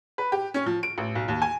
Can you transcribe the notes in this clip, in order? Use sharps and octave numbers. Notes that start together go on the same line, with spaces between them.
B4
G4
C#4
F3
D7
A1
B1
D#2
G#5